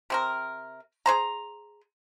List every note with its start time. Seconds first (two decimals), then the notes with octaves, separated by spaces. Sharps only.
0.10 C3 C4 A#4
1.06 G#4 C5 A#5